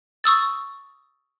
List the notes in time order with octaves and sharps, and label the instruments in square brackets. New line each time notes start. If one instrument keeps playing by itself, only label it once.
[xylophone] C#6 D#6 E6 A6